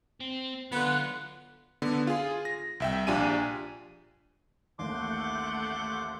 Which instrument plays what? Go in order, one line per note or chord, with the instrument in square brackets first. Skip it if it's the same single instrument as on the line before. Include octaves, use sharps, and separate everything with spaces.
[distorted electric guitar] C4
[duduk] D3 [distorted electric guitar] F#3 F4 [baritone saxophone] B3 [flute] F#6
[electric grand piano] D3 B3
F4 G#4
A#6
C2 E5 G5
A#1 D4 F4 G4 G#5 D#7
[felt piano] A1 D#2 [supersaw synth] A3 F#5 G6 [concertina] C6 D6